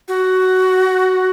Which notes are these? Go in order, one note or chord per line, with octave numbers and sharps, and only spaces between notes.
F#4